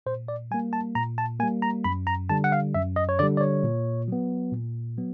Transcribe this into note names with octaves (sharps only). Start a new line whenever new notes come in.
A#2 C5
D5
G3 A#3 G#5
A5
A#2 A#5
A5
G3 A#3 G#5
A#5
F#2 B5
A#5
D3 G3 A5
F#5
F5
F#2 E5
D#5
C#5
D3 G3 D5
D5
C#5
A#2
F#3 B3
A#2
F#3 B3